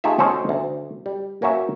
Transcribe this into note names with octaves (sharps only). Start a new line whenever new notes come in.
A3 D#4 F4 G4 G#4 E5
C#4 F#4 A4 C5 D#5
D2
G3
A#3 C#4 F#4 E5